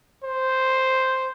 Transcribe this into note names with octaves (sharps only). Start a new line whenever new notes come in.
C5